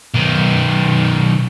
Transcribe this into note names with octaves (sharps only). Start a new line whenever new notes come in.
B1 D#3